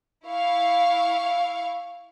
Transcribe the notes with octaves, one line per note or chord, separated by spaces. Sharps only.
E4 F5 C#6